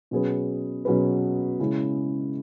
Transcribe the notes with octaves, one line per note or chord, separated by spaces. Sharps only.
B2 F#3 C#4 G#4 B4
B2 F#3 C#4 G#4 B4
C#3 G#3 C#4 E4